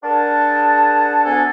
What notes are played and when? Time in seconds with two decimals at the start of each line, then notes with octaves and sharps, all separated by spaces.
0.04 D4 G#4 A#4 F#5 A5
1.24 D2 B3 D4 A4 G#5